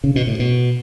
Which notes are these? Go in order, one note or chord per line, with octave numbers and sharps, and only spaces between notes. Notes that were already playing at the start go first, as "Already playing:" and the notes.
C#3
B2
A2
B2